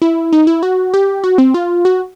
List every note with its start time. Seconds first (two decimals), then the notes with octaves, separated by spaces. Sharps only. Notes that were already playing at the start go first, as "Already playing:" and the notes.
0.02 E4
0.33 D#4
0.47 E4
0.63 F#4
0.94 G4
1.24 F#4
1.38 C4
1.54 F4
1.85 F#4